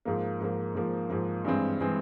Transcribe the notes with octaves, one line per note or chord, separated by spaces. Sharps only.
G#2 F3 A#3
G#2 F3 A#3
G#2 F3 A#3
G#2 F3 A#3
G2 E3 G#3 C4
E3 G#3 C4